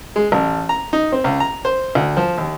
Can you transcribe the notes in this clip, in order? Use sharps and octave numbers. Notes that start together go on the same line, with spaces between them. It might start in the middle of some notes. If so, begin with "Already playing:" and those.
G#3
A1
A#5
D#4
C4
C#2
A#5
C5
D2
F3
D#2